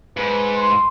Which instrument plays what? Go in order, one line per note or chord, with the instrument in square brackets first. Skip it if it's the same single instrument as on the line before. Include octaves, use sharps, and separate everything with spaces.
[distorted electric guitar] G#2 [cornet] B4
[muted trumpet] C6